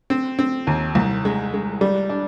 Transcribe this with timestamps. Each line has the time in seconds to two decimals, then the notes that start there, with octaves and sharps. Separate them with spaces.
0.10 C4
0.39 C4
0.67 D#2
0.95 C2
1.25 G#3
1.54 G#3
1.81 G3
2.10 D4